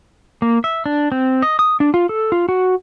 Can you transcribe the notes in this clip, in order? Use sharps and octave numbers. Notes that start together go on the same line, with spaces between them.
A#3
E5
D4
C4
D#5
D#6
D4
F4
A4
F4
F#4